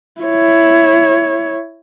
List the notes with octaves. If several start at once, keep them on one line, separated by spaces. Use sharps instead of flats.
E4 C#5